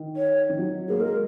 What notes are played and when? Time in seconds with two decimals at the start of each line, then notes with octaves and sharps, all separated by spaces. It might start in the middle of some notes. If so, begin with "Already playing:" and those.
Already playing: D#3
0.16 C#5
0.49 D#3
0.59 F#3
0.89 A#3 G#4
1.00 G#3 A#4